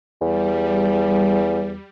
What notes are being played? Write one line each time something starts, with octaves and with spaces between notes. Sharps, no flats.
E2 G3